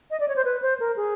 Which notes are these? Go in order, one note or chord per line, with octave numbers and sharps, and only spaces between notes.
D#5
D5
C#5
C5
B4
C5
A#4
G#4